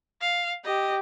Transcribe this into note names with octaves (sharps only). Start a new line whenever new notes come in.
F5
G4 D#5